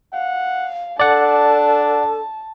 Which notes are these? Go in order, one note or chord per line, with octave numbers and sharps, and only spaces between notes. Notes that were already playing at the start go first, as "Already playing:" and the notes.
F5 F#5
D4 A4 D5 F#5 A5